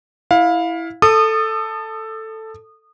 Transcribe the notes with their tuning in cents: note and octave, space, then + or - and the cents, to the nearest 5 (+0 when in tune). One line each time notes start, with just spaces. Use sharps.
E4 +0 F5 +20
A4 +5 D#6 -25